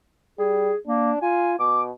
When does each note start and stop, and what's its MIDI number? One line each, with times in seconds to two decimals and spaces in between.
0.39 0.72 55
0.39 0.77 68
0.87 1.11 58
0.87 1.19 62
1.22 1.57 65
1.22 1.53 80
1.59 1.91 47
1.59 1.81 86